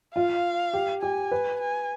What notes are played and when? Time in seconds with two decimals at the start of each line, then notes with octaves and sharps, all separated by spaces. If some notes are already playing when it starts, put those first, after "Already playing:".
0.15 F4 F5
0.74 G4
1.02 G4 G#5
1.31 B4
1.61 G#5